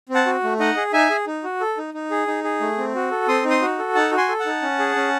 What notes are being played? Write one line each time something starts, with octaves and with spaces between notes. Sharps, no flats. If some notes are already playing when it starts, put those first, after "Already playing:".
C4
F#5 A5
F#4
A3
D#4 D#5 F#5
G#4
D#4 E5 G#5
G#4
D#4
F#4
A4
D#4
D#4
G#4
D#4
G#4
A3
C4
F#4
A4
C4 C6 D#6
D#4
C6 D#6
F#4
A4
D#4 F#5 A5
F#4
G#5 C6
A4
F#5 A5
D#4
C#4
G#4
C#4